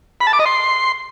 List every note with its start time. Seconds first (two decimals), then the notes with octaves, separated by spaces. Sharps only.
0.21 B5
0.27 A5
0.33 D6
0.39 D#5
0.46 C6